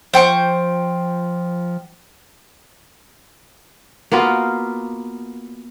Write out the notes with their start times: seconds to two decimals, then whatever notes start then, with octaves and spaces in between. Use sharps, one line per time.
0.14 F3 C5 G5 C#6
4.12 A#3 B3 F4 F#4